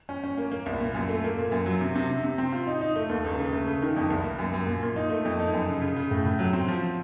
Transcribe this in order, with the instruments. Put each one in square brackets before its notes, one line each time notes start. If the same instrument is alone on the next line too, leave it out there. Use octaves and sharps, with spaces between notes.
[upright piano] C#4
C#4
A#3
A#3
C2
A#2
F#2
A3
A#3
A#2
F#2
F#3
C3
C3
C3
C3
C4
F4
D#4
D#4
A3
D#2
C#2
C#3
A3
C#3
D#3
F2
C2
A#3
F#2
F#2
A#2
A#2
D#4
A3
F2
D#4
F#2
C#3
C#3
C#3
A2
A2
F#3
C4
F3